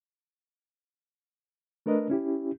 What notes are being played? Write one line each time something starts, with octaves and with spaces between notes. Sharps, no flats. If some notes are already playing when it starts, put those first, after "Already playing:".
A3 D4 A#4 B4 D#5
C#4 E4 G4